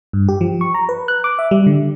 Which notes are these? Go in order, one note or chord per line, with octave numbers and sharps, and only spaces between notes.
G2
G4
F3
C#6
A#5
B4
F#6
D6
E5
G3
D3